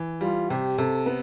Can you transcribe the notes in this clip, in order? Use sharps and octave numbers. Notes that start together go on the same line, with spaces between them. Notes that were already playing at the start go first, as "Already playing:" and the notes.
Already playing: E3
G3 F4
C3 G4
C3 A4
B3